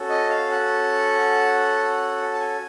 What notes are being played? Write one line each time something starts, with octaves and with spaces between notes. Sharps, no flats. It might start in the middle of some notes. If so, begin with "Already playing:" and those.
Already playing: C#4 F#4 A4
D#5
F5
F#5
A5
G#5